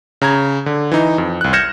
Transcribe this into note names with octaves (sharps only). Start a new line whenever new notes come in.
C#3 A#5 G#6
D3
E3 D#4
F2
C2 F#6
F6 G6 G#6 A#6 C#7 E7